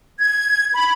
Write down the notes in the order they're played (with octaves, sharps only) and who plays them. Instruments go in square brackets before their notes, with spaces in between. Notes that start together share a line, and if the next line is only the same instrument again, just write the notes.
[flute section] G#6
B5